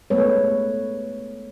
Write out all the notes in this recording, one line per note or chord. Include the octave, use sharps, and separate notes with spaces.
G#3 A3 B3 B4 C#5